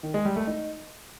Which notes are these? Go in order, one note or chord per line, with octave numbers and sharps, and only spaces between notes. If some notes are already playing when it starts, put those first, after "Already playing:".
D#3
G#3
G3
A3
D#4